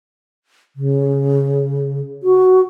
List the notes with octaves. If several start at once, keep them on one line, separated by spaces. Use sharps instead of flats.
C#3
F#4